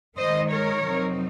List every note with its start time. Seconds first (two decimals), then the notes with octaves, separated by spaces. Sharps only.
0.17 D#3 G#3 D#4 C5 D#5
0.50 A#4 C#5
0.83 F2 C3 F#3 C4 D#4